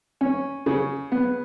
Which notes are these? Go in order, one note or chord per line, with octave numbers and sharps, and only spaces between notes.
C#4
C#3
B3